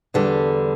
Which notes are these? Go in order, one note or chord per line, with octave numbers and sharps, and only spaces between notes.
E2 D3 G3